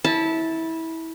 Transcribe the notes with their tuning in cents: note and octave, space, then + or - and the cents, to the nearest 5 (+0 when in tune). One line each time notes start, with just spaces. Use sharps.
E4 -20 A5 +0